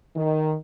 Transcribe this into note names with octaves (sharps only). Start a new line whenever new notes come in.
D#3